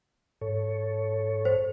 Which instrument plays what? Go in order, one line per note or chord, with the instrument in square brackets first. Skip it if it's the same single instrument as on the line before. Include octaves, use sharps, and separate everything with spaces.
[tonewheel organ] G#2 A4 C#5
[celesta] C5